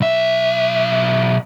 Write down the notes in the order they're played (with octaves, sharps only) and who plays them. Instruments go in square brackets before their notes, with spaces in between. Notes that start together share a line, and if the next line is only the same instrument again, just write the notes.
[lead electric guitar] B1 E5